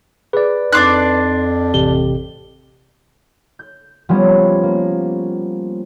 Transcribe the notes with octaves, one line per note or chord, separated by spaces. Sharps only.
G#4 B4 D5
F2 D4 D#4 C6 D6 F#6 C7
A1 C3 G4 G7
G6
F3 G3 B3 C#4 G4
A#3